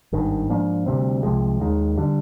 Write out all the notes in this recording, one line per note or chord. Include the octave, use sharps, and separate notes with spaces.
G#1 G2 D#3
G#2 F3 A#3 D4
D2 C3 G3 C4
C2 C3 F3 G#3
D#2 D#3 G#3
D3 G3